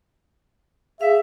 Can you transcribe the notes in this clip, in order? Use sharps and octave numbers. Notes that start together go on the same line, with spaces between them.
G#4 E5 F5